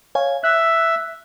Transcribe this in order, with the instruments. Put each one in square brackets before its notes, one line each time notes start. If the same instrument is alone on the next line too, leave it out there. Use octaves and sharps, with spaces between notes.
[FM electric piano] C#5 F5 G#5
[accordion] E5 [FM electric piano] F#6